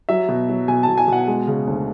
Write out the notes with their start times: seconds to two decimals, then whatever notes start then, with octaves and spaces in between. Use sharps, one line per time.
0.09 F#3 E5
0.29 B2
0.49 F#3
0.68 B2 G#5
0.83 A5
0.88 B2
0.98 G#5
1.08 B2 F#5
1.27 G#3
1.47 C#3
1.67 D2